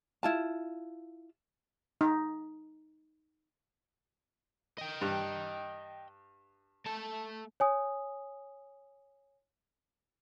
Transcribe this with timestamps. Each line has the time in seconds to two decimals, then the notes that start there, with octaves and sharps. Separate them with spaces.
0.23 E4 F4 A5
2.01 D#4
4.78 D#5 G5
5.01 G2
6.87 A3 A5
7.60 C#5 G#5 D#6